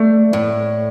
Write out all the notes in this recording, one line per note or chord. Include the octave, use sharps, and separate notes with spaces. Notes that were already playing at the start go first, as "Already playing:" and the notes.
Already playing: A3 D5
A2